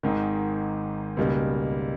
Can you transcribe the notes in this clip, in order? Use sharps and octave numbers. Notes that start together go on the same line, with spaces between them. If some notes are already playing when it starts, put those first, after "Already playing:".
G#1 G#2 D#3
C#2 B2 G3 A#3 D#4